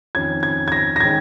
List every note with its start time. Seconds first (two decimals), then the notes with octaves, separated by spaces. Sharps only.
0.15 F2 D#3 C#4 G#6
0.43 G#6
0.68 G#6
0.72 A#6
0.96 A#6
1.00 D#3 G#3 C#4 G#6